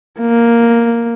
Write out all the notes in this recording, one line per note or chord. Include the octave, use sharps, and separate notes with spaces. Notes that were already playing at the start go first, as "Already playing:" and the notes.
A#3